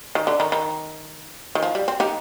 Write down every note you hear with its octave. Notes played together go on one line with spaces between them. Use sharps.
D#3
D3
D#3
D#3
D#3
F3
G3
C4
D#4 G4